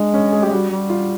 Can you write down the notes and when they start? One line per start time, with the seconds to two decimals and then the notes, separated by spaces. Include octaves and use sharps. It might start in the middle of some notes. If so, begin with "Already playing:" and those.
Already playing: G#3 D4
0.14 C#4
0.32 G#4
0.42 G4
0.46 G#3
0.51 G3 F#4
0.70 G3
0.90 F4